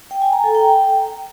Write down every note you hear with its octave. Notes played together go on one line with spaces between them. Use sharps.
G5
G#5
A#5
A4
G5